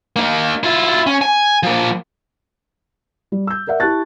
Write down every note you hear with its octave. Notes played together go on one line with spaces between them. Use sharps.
A#3 D#4
E4 F4
C#4
G#5
F3 A#3
G3
E6 G6
A#4 D5 E5 F#5
E4 G4 A5 C#6 F#6 A6